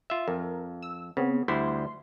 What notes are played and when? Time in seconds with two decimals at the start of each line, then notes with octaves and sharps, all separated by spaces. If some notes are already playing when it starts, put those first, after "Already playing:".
0.10 F4 E5
0.28 F2 A#4
0.82 E6
1.17 C#3 B3 C4
1.48 D2 G3 E4 C6